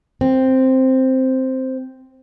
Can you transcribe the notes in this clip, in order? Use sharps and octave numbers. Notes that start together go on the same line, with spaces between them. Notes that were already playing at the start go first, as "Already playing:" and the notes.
C4